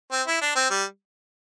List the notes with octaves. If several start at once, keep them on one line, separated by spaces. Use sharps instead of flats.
C4
E4
D4
C4
G3